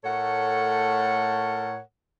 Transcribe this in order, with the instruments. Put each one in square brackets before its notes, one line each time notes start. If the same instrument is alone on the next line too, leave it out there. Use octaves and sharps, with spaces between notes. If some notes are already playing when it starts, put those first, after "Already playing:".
[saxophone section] A2 A3 A4 A#4 C#5 F#5